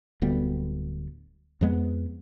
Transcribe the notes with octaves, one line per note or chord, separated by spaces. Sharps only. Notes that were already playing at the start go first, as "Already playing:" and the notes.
D1 D2 G3 B3
F2 F3 G#3 B3